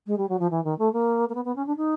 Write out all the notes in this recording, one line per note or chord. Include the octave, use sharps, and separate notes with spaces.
G#3
G3
F#3
F3
E3
D#3
A3
A#3
A#3
B3
B3
C#4
D4
D#4